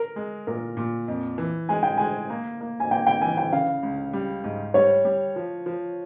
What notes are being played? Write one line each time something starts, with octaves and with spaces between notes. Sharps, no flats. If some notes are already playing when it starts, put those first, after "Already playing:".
Already playing: A#4
G#3
A#2 A#4
A#2
F2
E3
G#3 G#5
G5
G#3 G#5
A#3
A#3
G#5
A#3 G5
G5
E3 G#5
G5
C#3 F5
C#2
G3
G#2
G3 C#5
G3
F3
F3